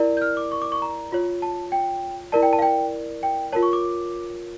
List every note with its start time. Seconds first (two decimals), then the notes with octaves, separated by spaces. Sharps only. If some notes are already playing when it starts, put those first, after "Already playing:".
Already playing: E4 A#4 D5
0.17 G6
0.22 F6
0.37 D6
0.52 C#6
0.62 D6
0.72 C#6
0.82 A#5
1.12 F4 C#5
1.42 A5
1.72 G5
2.32 E4 A#4 D5 A5
2.43 G5
2.53 A5
2.59 F5
2.62 G5
3.23 G5
3.52 F4 A#4 C#5 A5
3.63 C#6
3.73 D6